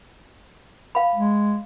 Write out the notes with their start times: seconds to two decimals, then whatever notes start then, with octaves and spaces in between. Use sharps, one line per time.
0.95 F5 B5
1.15 G#3